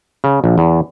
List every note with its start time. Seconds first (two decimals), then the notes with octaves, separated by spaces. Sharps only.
0.24 C#3
0.44 A#1
0.58 E2